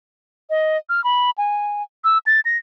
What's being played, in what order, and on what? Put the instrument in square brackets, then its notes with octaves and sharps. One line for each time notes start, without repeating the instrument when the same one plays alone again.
[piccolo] D#5
F6
B5
G#5
E6
A6
A#6